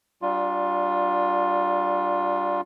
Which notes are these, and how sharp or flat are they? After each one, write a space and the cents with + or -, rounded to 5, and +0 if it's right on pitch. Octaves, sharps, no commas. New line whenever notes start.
G3 -15 D4 +0 F4 +20